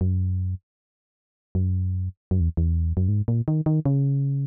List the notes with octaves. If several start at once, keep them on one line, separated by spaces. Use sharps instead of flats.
F#2
F#2
F#2
E2
E2
F#2
G#2
A#2
D#3
D#3
C#3